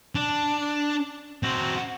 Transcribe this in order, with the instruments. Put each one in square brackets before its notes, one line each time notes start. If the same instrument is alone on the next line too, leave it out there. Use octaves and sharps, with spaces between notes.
[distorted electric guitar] D4
C4 F#4